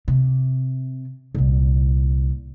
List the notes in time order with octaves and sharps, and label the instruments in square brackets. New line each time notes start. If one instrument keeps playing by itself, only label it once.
[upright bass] C3
C2 A#2